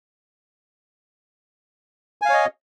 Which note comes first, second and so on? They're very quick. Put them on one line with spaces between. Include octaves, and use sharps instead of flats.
G#5 F5 C#5 D#5